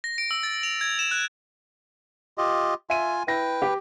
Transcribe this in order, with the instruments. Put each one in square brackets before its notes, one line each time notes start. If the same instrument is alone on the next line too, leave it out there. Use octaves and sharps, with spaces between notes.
[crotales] A#6
D7
E6
A6
F7
G#6
E7
F#6
[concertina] F4 G4 D#5
[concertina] F4 G#5 [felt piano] E5 D#7
[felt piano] E4 A#6 [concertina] B4 G5
[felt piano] G4